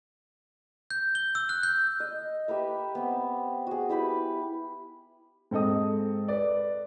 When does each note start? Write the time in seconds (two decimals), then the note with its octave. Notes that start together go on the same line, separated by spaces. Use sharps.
0.91 G6
1.15 G7
1.35 E6
1.49 F#6
1.63 G6
2.00 D#5
2.48 G4 A#4 B4 E5
2.95 B3 C4
3.67 F#4 G#4
3.89 E4 G4 B4 B5
5.51 G#2 C4 A4 D#5 D#6
6.28 B4 D5